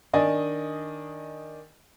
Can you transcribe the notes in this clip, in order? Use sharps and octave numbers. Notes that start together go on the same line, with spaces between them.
D#3 D4 D5 D#5 G#5